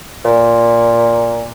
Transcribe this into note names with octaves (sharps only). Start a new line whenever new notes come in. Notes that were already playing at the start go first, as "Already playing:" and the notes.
A#2